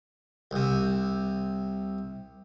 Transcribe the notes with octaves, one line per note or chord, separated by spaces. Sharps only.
C2 C3